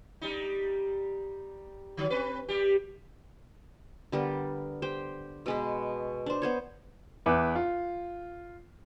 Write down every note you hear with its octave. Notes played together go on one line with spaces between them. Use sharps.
G3 D#4
D3 F#3
C4 B4
G3 G4
D3 G3 B3 A#4
G4 C5 G5
B2 G#3 B4
D4 C5
B3 C5 C#5
E2 B4 E5 D6
F4